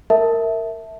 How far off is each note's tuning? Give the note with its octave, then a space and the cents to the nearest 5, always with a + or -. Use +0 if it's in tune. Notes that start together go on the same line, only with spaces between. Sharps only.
A#4 -20 E5 -10 A5 +0